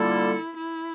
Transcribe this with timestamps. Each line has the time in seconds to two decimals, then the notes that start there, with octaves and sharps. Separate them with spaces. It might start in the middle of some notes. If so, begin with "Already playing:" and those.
Already playing: D3 G3 A#3 E4 F4 A4
0.57 E4